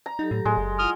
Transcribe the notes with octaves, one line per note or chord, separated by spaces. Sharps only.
A#5
F#3 D#4 G4 A4
A2
A2 G#3
F#1
E4 F4 F#5 D#6 F6